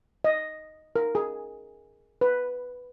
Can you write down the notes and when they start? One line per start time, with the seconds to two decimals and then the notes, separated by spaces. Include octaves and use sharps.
0.24 D#5
0.96 A#4
1.15 G#4
2.21 B4